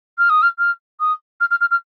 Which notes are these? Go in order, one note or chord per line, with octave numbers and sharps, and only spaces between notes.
F6
D#6
F6
F6
D#6
F6
F6
F6
F6